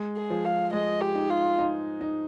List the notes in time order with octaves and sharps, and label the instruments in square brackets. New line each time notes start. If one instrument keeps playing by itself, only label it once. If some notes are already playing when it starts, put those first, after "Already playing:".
Already playing: [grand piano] G#3
[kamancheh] G#4
[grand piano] F3
[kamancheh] F5
[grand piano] G#3 [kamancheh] D#5
[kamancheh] G4
[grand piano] D#4
[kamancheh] F4
[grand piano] D#4
D#4